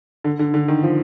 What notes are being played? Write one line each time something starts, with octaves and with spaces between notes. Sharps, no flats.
D3
D3
D3
D#3
F3